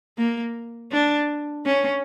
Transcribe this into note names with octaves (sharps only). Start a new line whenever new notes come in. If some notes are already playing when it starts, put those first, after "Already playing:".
A#3
D4
C#4